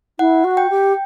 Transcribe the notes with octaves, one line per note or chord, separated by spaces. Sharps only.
E4 F#5
F#4
G5
G4